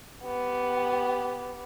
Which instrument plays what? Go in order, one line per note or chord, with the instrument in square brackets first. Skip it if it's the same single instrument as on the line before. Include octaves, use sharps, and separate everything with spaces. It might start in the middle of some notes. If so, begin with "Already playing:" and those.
[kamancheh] B3 G4